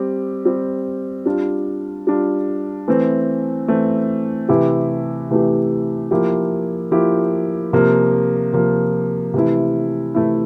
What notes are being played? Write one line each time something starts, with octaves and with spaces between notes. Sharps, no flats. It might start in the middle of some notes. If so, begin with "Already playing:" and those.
Already playing: G3 C4 G4
G3 C4 G4
G3 D4 F4
G3 D4 F4
E3 A3 C4
E3 A3 C4
C3 E3 A3 E4 G4
C3 E3 A3 E4 G4
F3 A#3 E4 G4
F3 A#3 E4 G4
C3 F3 A#3 F4
C3 F3 A#3 F4
C3 E3 A3 E4
C3 E3 A3 E4